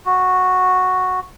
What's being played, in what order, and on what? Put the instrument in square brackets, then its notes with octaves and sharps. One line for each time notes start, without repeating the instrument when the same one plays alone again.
[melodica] F#4